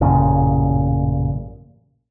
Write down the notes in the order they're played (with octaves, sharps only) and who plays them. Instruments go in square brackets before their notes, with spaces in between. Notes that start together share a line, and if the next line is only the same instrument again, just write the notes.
[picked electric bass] A1 F#2 A#2 C#3